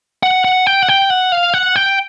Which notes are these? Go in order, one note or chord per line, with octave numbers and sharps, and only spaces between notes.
F#5
F#5
G5
F#5
G5
F#5
F5
F#5
G5